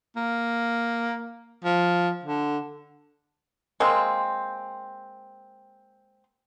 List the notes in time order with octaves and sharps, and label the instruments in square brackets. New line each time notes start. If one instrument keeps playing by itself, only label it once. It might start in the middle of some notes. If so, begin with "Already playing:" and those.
[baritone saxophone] A#3
F3
D3
[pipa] G#3 A#3 C4